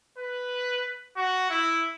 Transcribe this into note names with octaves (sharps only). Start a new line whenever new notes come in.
B4
F#4
E4